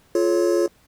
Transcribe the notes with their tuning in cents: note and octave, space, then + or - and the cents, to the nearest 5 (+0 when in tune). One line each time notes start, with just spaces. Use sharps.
F4 -5 A4 -40 C#5 +0